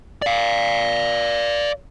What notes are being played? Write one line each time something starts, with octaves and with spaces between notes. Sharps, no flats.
D5 F5